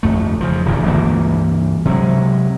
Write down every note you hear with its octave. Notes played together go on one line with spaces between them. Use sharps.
G1 F2 A3
C#3 F3
D1 E2 G2 D3
C#2 G2 E3 A#3
C3 F#3 G#3